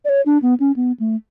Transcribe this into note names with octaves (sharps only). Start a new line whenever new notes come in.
D5
C#5
D4
B3
C#4
B3
A3